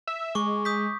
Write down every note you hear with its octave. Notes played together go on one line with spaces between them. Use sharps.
E5
G#3 C#6 D6
D#6 G6 B6